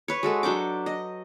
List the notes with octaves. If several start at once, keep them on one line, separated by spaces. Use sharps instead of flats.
B4 C#5
G#3 F#4 A4
F#3 D4 G5 D6
D#5